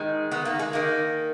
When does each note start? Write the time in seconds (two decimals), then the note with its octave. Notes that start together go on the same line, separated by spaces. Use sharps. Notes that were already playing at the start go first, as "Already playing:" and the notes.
Already playing: G#2 D#3 G#3
0.31 D#3 B3
0.45 A#3
0.59 G#3
0.73 D#3 A#3